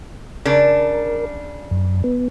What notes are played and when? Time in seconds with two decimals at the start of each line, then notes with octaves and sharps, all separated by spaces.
0.45 C#3 D4 A#4
1.71 F#2
2.04 B3